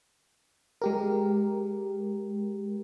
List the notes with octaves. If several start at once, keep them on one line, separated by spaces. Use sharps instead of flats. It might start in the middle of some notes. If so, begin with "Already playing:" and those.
G#3 G4 A#4